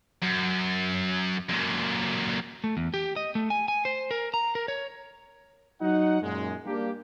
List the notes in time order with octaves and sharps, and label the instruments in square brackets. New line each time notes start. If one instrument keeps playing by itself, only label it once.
[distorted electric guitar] F#2
F#2 A#2
[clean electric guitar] A3
E2
G4
D#5
A3
G#5
G#5
C5
A#4
A#5
A#4
C#5
[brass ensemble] F#3 D#4 F#5
F#2 A#2 G#3
G3 A#3 D4 G4